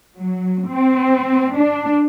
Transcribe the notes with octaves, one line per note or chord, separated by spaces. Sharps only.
F#3
C4
D4